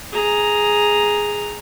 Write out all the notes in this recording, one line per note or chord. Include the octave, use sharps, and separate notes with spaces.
G#4 A#5